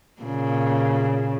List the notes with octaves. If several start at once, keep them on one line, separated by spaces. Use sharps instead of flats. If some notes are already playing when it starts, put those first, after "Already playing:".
A#2 C#3